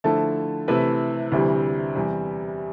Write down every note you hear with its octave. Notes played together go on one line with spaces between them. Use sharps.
D3 F3 A3 E4 A4
C3 E3 A3 E4 B4
D2 C3 E3 G3
E2 C3 G3